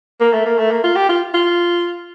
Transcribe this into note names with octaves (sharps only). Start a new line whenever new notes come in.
A#3
A3
A#3
A3
A#3
F4
G4
F4
F4